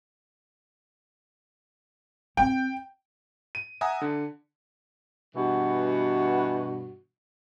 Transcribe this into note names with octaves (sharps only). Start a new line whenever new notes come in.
C4 G5
D#7
E5 F#5 G#5 A#5 D#6
D3
G2 B2 E3 F#4